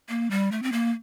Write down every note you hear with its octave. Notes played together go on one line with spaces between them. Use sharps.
A#3
G3
A3
C4
A#3